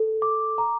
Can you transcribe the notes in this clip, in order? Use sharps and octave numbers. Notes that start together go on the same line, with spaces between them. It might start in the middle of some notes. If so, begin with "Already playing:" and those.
Already playing: A4
D6
A#5